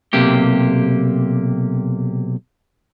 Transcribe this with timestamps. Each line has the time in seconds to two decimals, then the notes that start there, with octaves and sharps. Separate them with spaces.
0.13 B1 C3 A#3 G4